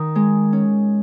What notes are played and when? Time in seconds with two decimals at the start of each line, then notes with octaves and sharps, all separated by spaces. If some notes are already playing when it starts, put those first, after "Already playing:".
Already playing: D#3
0.15 G#3
0.53 C#4